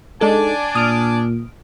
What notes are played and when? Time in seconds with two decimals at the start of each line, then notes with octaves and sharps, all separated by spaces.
0.21 G#3 D4 D#4 A4 G#5
0.75 A#2 D#6 F6 D7